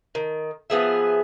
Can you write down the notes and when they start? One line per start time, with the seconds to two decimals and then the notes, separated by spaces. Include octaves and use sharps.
0.15 D#3
0.70 F3 B3 G#4 E5